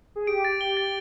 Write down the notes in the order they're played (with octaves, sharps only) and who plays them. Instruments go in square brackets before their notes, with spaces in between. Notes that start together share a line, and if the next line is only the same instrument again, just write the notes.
[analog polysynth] G#4
[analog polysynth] G4 [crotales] D7
[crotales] A6
G7
A6